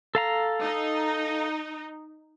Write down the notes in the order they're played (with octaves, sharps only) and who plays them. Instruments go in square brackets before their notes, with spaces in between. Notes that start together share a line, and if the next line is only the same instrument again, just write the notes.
[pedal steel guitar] A4 F5 A#5
[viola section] D#4